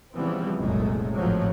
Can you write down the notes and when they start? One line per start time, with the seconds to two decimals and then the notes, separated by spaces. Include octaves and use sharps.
0.14 C#3 E3 F3 G3 B3 C4
0.59 F#1 C2 F#2 A#2 G#3 A3
1.18 G#1 A2 F3 F#3